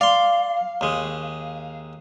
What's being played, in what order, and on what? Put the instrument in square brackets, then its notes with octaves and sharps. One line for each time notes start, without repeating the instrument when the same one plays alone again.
[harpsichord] D5 C6 [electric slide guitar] F5
[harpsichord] D#2 G#3